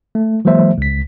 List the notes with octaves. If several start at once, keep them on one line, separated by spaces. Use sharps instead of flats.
A3
E3 F#3 G#3 A#3 C5 E5
C#2 B6